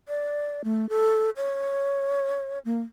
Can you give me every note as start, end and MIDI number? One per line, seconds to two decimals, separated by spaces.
0.08 0.62 74
0.64 0.89 57
0.89 1.30 69
1.37 2.59 73
2.65 2.81 58